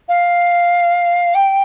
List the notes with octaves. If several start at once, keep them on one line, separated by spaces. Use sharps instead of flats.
F5
G5